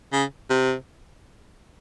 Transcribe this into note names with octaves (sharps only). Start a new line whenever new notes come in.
C#3
C3